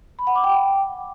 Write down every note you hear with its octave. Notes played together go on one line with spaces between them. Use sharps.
B5
F#5
D6
G5